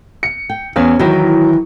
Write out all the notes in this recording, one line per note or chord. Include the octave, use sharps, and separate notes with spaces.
C#7
G5
E2 C#4 B4 F5
D#3 E3 F#3 E4